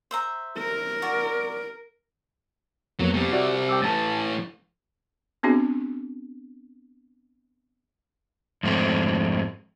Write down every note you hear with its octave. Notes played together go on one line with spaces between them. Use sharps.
C5 E5 A#5
A#4
F#4 D5
F2 F#3 A#3 B3
C3 G3
F#4 D5 E5
G5 D6 E6
A2 E3 A5 A6
B3 C4 D4 F#4 G#4
F2 G#2 A3 C4